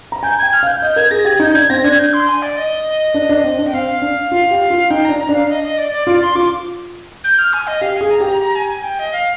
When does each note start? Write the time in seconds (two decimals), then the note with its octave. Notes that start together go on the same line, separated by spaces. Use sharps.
0.12 A#5
0.23 G#5 G6
0.38 G5 G#6
0.53 F6
0.63 F5
0.67 G6
0.82 D#5 G6
0.96 A#4 G#6
1.10 G#4 A#6
1.25 G4 G#6
1.40 D#4 G6
1.54 D4 G#6
1.69 C4 A#6
1.84 D4 G#6
1.99 G6
2.13 C6
2.28 G#5
2.42 D5
2.57 D#5
3.14 D4
3.29 D4
3.44 C4
3.58 D4
3.66 G5
3.73 C4 F5
4.02 D4
4.32 F4
4.51 G4
4.70 F4
4.90 D#4 G5
5.04 D4 A#5
5.19 A#5
5.29 D4 F5
5.49 D#5
5.63 D#5
5.77 D5
5.92 D5
6.07 F4 D5
6.21 C6
6.35 F4 D6
7.24 G6
7.38 F6
7.53 G#5
7.67 D#5
7.81 G4 F5
7.96 G#4 G#5
8.10 A#5
8.20 G4 A#5
8.40 A#5
8.55 G#5
8.69 G#5
8.83 G5
8.99 D#5
9.12 F5